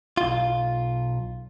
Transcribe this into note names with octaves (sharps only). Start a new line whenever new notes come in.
B1 F4